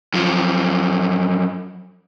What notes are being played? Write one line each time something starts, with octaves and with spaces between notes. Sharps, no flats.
F#2 F3